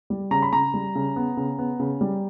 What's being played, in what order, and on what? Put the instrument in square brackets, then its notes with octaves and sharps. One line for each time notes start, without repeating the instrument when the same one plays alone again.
[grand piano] G3
C#3 A#5
B5
C#3 A#5
G3
C#3
B3
C#3
B3
C#3
G3